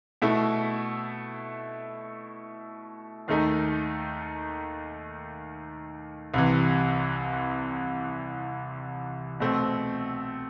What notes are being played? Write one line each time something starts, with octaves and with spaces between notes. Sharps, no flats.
B2 A3 E4
D#2 D#3 A3 D#4
C2 C3 E3
B2 A3 C4